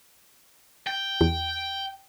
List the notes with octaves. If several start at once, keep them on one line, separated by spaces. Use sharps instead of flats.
G5
E2